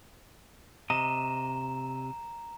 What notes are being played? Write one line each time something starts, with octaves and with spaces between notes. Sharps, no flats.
C3 D#5 A#5 E7